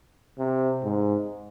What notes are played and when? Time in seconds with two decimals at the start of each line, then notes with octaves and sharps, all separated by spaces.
0.38 C3
0.84 G#2